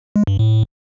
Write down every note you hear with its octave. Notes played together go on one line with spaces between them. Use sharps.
G#3
G2
A2